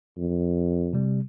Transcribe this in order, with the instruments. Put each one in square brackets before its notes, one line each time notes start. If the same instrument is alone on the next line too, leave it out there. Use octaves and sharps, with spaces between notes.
[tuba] F2
[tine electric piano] C3 G3